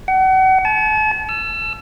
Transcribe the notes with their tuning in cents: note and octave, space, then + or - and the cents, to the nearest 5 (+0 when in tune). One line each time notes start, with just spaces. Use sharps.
F#5 +35
A5 -40
E6 +30